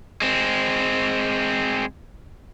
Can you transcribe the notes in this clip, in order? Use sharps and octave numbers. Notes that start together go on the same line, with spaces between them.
G#3 C4